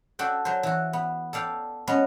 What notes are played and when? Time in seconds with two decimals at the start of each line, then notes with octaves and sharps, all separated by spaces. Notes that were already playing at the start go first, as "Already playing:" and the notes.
0.19 D4 F#4 A4 G5
0.45 F#3 C5
0.63 E3 F#4
0.93 B3
1.33 A4 D5 F5 G5
1.87 G#3 B3 C#4